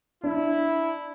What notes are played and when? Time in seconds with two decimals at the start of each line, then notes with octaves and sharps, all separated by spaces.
0.24 D4 E4